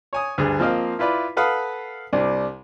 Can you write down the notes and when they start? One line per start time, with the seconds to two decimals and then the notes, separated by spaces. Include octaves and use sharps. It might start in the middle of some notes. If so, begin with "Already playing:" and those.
0.13 C#5 G#5 D#6
0.38 D2 G2 G#4
0.60 F3 A#3 C4 D#5 F5
0.99 E4 F4 B4 D5 B5
1.37 A4 B4 F5 F#5 B5 D#6
2.13 C2 G3 D4